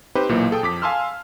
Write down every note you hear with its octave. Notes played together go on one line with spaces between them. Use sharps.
C4 D#4 G4 B4 C5
B1 A#2 E3 A#3
G#4 A4 G5 D#6
F2 D6 B6
F5 G#5 A5 C6 E6 F6